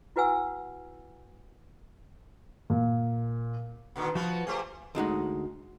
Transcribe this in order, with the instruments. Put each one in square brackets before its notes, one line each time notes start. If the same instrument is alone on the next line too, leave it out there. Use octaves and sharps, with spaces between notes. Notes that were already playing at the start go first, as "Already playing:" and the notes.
[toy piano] E4 F#4 B4 F#5 G#5 E6
[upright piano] A#2
[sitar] A#2 D3 D#3
[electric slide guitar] F3 F4 [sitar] B3 F#4 B4
[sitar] A3 G4 C5 [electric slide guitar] G#4
[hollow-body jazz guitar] D2 G#3 D#4 F#5